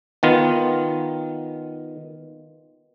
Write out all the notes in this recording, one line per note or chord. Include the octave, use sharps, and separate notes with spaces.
D#3 B3 F4